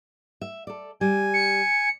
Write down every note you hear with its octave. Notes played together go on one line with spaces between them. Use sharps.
E5
A4 D5
G3 G#5
C#7